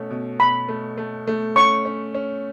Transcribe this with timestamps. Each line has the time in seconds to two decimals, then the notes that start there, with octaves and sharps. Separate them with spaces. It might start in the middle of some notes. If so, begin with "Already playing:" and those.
Already playing: B2 A3 C#4
0.10 B2
0.39 B2 B5
0.69 A3
0.98 A3
1.27 A3
1.56 C#4 C#6
1.85 C#4
2.15 C#4